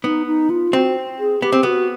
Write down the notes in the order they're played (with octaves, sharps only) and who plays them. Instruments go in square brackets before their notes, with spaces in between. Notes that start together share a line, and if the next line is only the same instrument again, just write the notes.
[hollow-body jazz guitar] B3 [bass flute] D#4
[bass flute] D#4
F4
[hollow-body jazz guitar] C4 [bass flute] F#4
[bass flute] G#4
[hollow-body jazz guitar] B3 [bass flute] G4
[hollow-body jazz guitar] C4
[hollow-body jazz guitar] B3 [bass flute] F#4